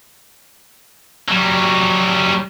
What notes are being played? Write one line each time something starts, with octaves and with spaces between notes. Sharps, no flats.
F#3 G3